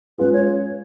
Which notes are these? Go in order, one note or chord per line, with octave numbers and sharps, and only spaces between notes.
G#3 C#4 F4 G#4 B4
C#5